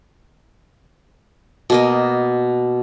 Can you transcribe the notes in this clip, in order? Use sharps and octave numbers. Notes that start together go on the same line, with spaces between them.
B2 A#3 D#5